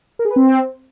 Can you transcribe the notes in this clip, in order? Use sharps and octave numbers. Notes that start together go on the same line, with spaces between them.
A#4
G#4
B4
C4